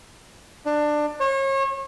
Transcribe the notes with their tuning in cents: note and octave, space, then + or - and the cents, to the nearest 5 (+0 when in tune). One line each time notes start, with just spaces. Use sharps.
D4 +20
C#5 -35